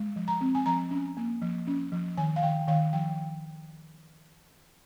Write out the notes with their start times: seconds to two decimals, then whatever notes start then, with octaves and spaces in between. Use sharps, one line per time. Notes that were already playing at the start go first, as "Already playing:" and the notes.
Already playing: G#3
0.16 F3
0.28 A#5
0.41 C4
0.55 G#5
0.66 F3 A#5
0.91 C#4
1.17 A#3
1.42 F3
1.67 C#4
1.92 F3
2.17 D#3 G#5
2.36 F5
2.43 D#3 G5
2.67 D#3 F5
2.93 F3 G5